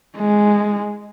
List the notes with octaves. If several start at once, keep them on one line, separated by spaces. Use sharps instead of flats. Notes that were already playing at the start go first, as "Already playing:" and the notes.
G#3